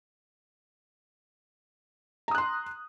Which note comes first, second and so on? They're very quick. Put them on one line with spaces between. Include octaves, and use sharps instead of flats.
A#5 D#6 F#6 C6